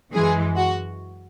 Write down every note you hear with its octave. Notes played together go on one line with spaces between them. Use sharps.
F#2 E3 G#3 G#4
F#4